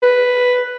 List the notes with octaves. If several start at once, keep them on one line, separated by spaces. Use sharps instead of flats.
B4